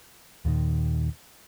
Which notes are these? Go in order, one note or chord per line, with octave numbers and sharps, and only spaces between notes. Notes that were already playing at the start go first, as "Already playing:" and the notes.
D#2 A#2 D#3